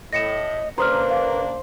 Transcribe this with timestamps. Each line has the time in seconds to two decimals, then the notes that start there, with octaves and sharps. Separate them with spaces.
0.13 A2 D#5 A#6 C#7 E7
0.78 C#3 A#3 D4 B4 C5 A#5 D#6 F6
1.11 F5